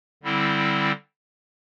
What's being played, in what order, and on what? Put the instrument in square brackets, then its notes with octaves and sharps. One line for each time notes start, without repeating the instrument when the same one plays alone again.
[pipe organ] D3 G3 C4 E4